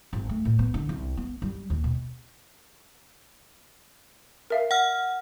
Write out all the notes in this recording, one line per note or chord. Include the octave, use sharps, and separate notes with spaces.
G#1
A3
A2
B3
D3
C2
B3
G3
D#2
B2
A#4 E5 F5
F#5 F6